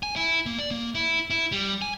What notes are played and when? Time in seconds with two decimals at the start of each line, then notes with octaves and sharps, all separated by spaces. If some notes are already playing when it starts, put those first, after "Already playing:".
0.03 G#5
0.16 E4
0.46 A#3
0.58 D5
0.71 A#3
0.95 E4
1.30 E4
1.52 G3
1.82 G#5